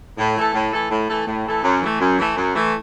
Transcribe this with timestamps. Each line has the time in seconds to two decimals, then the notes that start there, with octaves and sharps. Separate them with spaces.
0.18 A2
0.35 E3 A3 E4 A4
0.54 A2
0.72 E3 A3 E4 A4
0.90 A2
1.08 E3 A3 E4 A4
1.27 A2
1.45 E3 A3 E4 A4
1.63 F#2
1.82 E3 A3
2.00 F#2
2.19 E3 A3
2.37 F#2
2.55 E3 A3